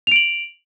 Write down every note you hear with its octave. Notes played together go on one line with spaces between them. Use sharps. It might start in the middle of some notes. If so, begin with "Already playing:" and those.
D7 F7 F#7